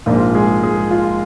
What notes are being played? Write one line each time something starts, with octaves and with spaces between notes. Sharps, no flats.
A#1 G#2 F3 A#3 F4
G#3 G#4
G#3 G#4
F4